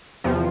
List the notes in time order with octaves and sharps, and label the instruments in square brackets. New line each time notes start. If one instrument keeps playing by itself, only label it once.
[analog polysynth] E2 C3 F3